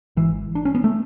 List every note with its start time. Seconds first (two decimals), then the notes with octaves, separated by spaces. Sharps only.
0.17 G#1 G#2 E3
0.55 D4
0.65 C#4
0.75 B3
0.84 A3